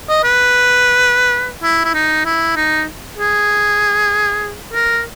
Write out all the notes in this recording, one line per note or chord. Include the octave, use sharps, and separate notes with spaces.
D#5
B4
E4
E4
D#4
E4
D#4
G#4
A#4